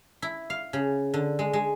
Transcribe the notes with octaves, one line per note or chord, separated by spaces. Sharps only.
E4
F5
C#3
D3
G#3
G#3